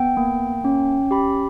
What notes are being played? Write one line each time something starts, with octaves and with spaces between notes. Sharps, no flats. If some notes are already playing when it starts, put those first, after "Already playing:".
Already playing: B3 G5
A#3
C#4
G4 B5